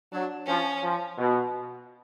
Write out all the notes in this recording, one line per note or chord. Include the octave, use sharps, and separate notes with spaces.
F#3 D4
F3 C#4
F3
B2